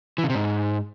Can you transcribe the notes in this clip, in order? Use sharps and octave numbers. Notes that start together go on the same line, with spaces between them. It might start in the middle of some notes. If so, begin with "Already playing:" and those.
E3
C#3
C3
G#2